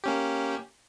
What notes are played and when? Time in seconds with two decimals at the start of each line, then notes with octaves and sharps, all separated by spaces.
0.04 A#3 C#4 G4